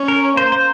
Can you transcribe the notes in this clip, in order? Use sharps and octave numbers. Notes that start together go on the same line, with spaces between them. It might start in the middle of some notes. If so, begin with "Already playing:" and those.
Already playing: C#4
A#4
A#3 C5
C5